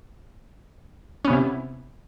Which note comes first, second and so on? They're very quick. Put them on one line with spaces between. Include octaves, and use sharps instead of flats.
C#4 B3 C3 E4